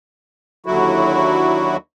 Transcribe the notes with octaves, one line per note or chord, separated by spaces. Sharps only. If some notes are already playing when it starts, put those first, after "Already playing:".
D#2 D3 F#3 E4 F#4